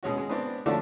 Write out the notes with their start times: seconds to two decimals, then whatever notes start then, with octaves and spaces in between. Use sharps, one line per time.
0.03 B2 G#3 C#4 F#4
0.18 G#3
0.29 B3 C4 D4 D5
0.66 D3 F3 A3 C#4 D4 F#4